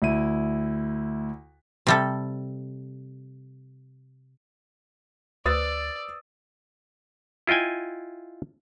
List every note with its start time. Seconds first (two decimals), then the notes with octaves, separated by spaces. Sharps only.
0.02 D2 E4 D#7
1.87 C3 G3 A4
5.46 D2 B4 C5 D5 D#6 E6 A6
7.47 E4 F4 D#5 G5 G#5